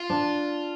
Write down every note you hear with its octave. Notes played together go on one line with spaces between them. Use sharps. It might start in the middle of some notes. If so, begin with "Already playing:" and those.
Already playing: F4
D4